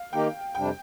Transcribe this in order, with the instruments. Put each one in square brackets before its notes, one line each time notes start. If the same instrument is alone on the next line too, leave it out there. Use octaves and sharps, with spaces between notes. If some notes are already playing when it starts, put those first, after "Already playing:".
Already playing: [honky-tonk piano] F5
[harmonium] D#3 A#3 D#4 G4 [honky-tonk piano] G5
[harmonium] F2 C3 G3 D4 [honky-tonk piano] G5